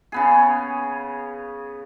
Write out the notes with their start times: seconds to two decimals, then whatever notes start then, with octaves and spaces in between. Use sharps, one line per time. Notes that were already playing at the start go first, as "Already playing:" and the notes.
0.12 C#3 B3 G#4